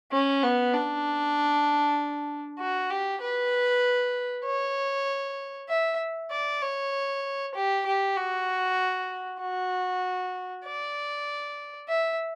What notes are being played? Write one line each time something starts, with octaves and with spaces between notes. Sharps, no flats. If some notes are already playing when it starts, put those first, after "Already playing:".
C#4
B3
D4
F#4
G4
B4
C#5
E5
D5
C#5
G4
G4
F#4
F#4
D5
E5